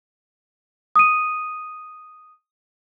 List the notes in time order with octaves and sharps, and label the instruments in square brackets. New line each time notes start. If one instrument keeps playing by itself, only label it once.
[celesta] D#6 D#7